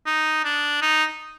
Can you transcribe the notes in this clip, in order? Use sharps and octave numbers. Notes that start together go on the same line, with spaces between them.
D#4
D4
D#4